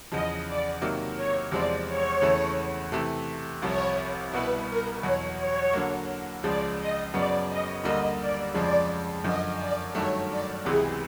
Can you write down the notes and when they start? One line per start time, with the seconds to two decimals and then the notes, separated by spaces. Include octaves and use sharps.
0.11 E2 C#3 F3 D#5
0.47 D5
0.82 C3 D#3 F#3 A#3
1.17 C#5
1.52 E2 C3 F3 G#3 C4 D5
1.87 C#5
2.22 E2 C#3 E3 A3
2.92 C3 E3 A3
3.62 C2 C3 F3 C#5
4.33 C2 B2 G3 B3 E4 B4
4.67 A#4
5.02 E2 B2 F#3 C#5
5.38 C#5
5.73 D3 F#3 A#3
6.43 C#2 C#3 F3 G#3 D5
6.78 D#5
7.14 F#2 C#3 F#3 B3 D5
7.49 D#5
7.83 D2 D3 G3 A#3 D#5
8.20 D5
8.54 F2 C#3 F3 G#3 D5
9.24 F#2 D3 F3 D#5
9.60 D5
9.95 G2 D#3 F#3 A3 C#5
10.29 D5
10.65 C#2 C3 E3 G#3 B3 G#4